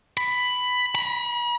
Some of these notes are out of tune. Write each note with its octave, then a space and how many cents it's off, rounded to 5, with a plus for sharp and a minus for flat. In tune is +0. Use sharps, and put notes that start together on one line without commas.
B5 +10
B5 -45